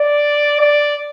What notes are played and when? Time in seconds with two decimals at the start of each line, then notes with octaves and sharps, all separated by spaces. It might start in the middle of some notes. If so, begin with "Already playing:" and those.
Already playing: D5
0.61 D5